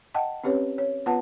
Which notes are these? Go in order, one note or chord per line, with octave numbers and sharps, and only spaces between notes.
D#5 F#5 G5 A5
C4 C#4 G4 B4 C#5
C#5
B3 F4 B4 F#5 A5